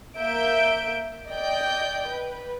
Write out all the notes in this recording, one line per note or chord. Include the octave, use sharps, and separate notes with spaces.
A#3 E5 G6 D7
D5 D#5 G5 G6
B4